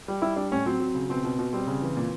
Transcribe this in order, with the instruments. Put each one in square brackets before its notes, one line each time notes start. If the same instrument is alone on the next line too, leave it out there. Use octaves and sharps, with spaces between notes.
[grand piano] G3
G3 E4
G3 D4
A2 C#4
F#3 C4
F#3
C#3
B2 C4
B2
B2
G3 C4
C#3
E3
A#2